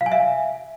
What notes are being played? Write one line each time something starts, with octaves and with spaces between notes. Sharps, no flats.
F5
G#5
E5